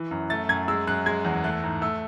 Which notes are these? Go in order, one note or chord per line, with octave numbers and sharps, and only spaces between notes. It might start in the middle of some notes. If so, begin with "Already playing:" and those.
Already playing: E3
F#2
A3 A6
F#2 G#6
G#3 E6
F#2 F#6
G#3 G#6
E2
A3 F#6
G#2
A3 E6